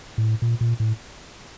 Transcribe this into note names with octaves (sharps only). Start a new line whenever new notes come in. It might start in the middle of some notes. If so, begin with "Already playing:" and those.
A2
A#2
A#2
A2